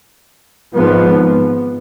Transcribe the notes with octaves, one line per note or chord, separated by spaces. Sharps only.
G#1 G#2 F3 B3